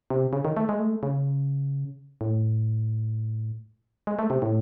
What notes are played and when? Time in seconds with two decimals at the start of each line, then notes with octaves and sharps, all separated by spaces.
0.10 C3
0.33 C#3
0.45 D#3
0.57 A3
0.69 G#3
0.79 A3
1.03 C#3
2.21 A2
4.07 G#3
4.19 A3
4.30 C3
4.42 A2